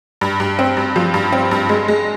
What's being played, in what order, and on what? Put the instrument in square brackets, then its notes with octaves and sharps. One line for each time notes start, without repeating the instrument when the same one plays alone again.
[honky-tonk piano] G2
G2
C4
G2
F3
G2
C4
G2
G#3
G#3